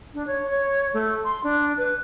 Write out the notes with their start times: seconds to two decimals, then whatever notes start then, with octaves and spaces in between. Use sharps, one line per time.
0.14 D4
0.27 C#5
0.50 C#5
0.93 A3
1.25 C6
1.44 D4
1.77 B4